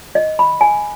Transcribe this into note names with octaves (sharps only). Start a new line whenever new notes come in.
D#5
B5
G#5